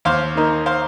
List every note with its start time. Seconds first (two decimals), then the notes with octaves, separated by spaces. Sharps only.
0.05 D#2 C5 F5
0.35 D#3 A#3 D#4
0.66 C5 F5